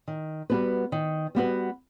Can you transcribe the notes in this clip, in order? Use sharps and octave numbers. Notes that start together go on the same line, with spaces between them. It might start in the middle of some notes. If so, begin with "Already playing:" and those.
D#3
G3 B3 F#4 B4
D#3
G3 B3 F#4 B4